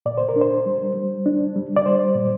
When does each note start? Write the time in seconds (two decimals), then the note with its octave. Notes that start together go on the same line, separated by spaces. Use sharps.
0.06 A#2 D5
0.18 C5
0.29 A#4
0.36 D4
0.41 C5
0.66 G3
0.95 G3
1.26 D4
1.56 G3
1.76 D5
1.86 G3 C5
2.16 A#2